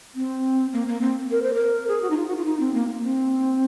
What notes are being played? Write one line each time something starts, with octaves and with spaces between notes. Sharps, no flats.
C4
A#3
A#3
C4
A#4
C5
A#4
G#4
F#4
D#4
F4
F#4
F4
D#4
C4
A#3
A#3
C4